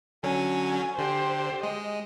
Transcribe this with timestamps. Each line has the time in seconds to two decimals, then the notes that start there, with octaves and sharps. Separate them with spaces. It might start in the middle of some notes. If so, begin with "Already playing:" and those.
0.23 D3 F#3 C#4 G#5
0.98 D3 G4 C5
1.63 G#3 D#5